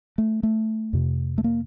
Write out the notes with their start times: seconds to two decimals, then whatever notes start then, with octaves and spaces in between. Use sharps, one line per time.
0.18 A3
0.43 A3
0.93 F2 C3
1.38 A3
1.44 A#3